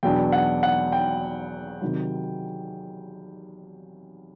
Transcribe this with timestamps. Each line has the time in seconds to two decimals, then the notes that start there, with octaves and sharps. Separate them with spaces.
0.03 E2 B2 F#3 B3 D4 G5
0.32 F#5
0.63 F#5
0.92 G5
1.82 C3 D#3 F#3